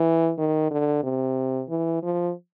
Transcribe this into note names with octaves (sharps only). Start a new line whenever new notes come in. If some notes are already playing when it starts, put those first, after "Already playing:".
Already playing: E3
D#3
D3
C3
E3
F3